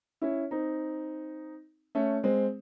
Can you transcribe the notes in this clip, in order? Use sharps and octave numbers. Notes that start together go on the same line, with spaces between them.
C#4 E4
C4 D#4
A3 C#4
G#3 C4